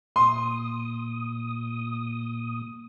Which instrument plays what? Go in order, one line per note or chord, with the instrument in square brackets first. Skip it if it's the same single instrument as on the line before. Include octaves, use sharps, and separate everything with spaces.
[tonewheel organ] A#2 D#6 [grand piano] C6